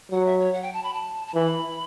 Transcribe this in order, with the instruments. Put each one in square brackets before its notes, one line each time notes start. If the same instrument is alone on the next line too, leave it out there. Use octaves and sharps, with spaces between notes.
[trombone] F#3 [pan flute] F#5
[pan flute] E5
C#5
F#5
G5
A5
B5
A5
A5
[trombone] E3 [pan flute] B5